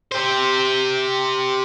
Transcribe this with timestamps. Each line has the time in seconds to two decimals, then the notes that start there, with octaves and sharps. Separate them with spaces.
0.12 G4 C5